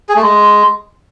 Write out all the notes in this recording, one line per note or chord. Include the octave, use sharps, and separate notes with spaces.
G#4
A3
G#3